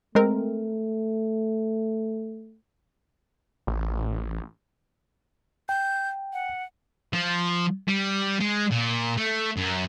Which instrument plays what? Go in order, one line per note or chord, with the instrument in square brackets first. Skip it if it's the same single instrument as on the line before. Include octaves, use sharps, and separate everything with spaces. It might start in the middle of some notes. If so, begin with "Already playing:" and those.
[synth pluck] G#3 C4 A#4 [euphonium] A3
[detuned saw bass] A1
[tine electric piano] G5 [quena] G6
[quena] F#5
[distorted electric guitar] F3
G3
G#3
A#2
A3
F#2